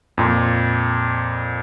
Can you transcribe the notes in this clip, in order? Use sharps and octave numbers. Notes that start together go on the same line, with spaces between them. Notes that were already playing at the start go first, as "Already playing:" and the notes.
F2 A#2